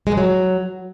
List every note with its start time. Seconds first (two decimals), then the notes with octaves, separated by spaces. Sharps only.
0.07 G#3
0.12 G2
0.17 F#3